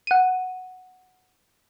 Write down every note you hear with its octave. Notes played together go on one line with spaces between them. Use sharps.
F#5 D#7